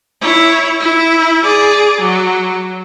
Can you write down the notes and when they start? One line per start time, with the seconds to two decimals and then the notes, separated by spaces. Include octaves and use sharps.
0.21 E4 C#5
0.81 E4
1.43 G#4 D5
2.01 F#3